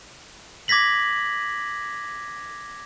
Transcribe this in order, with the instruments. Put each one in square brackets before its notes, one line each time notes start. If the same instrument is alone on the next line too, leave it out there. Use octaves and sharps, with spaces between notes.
[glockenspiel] D6 G#6 A#6 B6 F#7